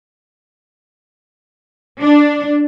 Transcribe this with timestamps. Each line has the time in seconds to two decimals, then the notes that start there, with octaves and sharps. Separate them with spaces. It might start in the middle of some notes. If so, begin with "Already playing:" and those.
2.01 D4